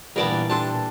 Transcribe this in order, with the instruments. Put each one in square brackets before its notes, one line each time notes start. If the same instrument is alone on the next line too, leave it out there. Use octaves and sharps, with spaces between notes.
[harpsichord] G2 B3 [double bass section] A#2 E3 [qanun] A#4 D5 A5
[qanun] G3 D4 A4 [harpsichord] A5 C6